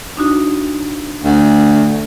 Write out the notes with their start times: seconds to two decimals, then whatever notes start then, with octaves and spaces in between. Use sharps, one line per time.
0.17 D4 D#4 F#4
1.24 D2